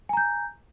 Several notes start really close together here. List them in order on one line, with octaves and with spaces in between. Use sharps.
G#5 A#5 G6